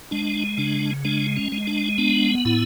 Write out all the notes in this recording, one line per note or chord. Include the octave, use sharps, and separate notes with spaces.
G#3 D4
C#3 D4
G#3 D4
C#4
G#3
D4
B3 D4
A2 E4